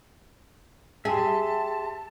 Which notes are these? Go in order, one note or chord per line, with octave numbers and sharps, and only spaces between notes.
G4 G#4 E5 A5 C6